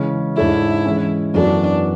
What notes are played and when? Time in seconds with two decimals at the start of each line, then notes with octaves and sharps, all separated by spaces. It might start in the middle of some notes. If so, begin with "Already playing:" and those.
Already playing: C#3 E3 G#3 C#4
0.36 G#2 G#3 D4 E4 A4 C#5
0.85 E3 G#3 C#4
1.34 F#2 E3 B3 D4 F#4 A4